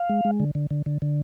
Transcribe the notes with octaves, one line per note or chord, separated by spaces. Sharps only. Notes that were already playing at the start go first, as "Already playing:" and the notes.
Already playing: F5
G#3
G#3
D3
D3
D3
D3
D3